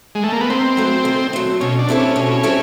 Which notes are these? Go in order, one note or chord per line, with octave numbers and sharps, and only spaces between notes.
G#3
A3
A#3
B3
D#3 C4
F#3 A3
D#3
F#3 A3
B2 C#4
D4
G3 C4 E4 A4
C#4
B2
G3 C4 E4 A4